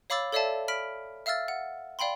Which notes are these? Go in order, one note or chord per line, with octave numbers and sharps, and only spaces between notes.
C#5 F5 B5 D6 E6 A6
A4 C#5 D5 E5 F5 A5
B5 F6 B6 D7
E5 F5 E6 F6 A6
F#5
D5 F5 G5 B5 C6